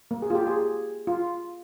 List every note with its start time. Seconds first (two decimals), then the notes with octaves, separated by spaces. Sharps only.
0.11 A#3
0.22 G#4
0.30 F4
0.35 G4
0.47 G#4
1.07 F4